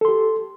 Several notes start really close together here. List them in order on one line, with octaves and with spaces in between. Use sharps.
A4 C6 G4